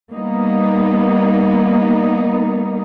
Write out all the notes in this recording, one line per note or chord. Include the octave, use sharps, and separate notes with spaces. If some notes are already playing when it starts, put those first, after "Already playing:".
G3 A#3 B3 D#4